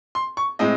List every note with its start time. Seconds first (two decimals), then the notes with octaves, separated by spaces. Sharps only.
0.15 C6
0.37 C#6
0.59 A2 G#3 C4 D#5